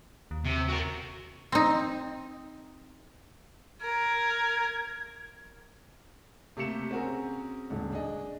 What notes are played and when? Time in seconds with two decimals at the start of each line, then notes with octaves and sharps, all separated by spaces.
0.31 D#2
0.45 C3
0.69 F#4 A#4
1.52 C4 D#4
3.82 A#4 G#6
6.57 C3 A3 A#3 G4 C#7 E7
6.91 C4 C#4 F#4 G#4 A#4
7.70 D#1 G#2 D3
7.92 D4 G#4 D#5